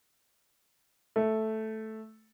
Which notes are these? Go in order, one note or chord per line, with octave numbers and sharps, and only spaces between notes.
A3